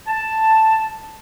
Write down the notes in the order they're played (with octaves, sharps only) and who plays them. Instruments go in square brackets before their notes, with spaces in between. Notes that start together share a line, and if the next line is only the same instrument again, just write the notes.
[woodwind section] A5